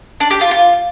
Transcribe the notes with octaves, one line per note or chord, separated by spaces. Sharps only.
D4
G4
F4
F4